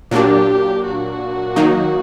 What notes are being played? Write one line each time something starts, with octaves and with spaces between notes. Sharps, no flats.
A#2 F#3 A#3 D4 G4
F#4
D#3 F#3 A#3 D#4